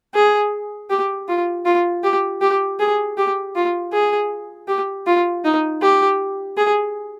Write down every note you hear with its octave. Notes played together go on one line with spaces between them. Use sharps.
G#4
G4
F4
F4
G4
G4
G#4
G4
F4
G#4
G4
F4
D#4
G4
G#4